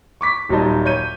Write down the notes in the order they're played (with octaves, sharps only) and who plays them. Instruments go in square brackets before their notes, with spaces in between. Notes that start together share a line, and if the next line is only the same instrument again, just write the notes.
[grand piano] C#6 D6 B6
D#1 F#3 G3 D#4 D#5 A5
C#5 G6 D#7